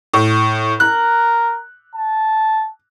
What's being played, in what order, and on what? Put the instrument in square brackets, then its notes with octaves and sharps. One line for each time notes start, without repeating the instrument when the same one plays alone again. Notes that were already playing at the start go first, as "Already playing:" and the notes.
[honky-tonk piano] A2
[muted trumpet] A#4 [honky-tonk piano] F#6
[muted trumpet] A5